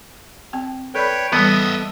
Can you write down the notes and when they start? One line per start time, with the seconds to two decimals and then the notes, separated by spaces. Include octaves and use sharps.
0.53 C4 G5
0.95 A4 B4 C#5 D5 G5 B5
1.33 E3 G3 B3 A4 D#5 E5